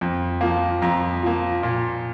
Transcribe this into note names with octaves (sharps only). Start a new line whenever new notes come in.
F2
F3 A#3
F2 A#5
F3 A#3
A#2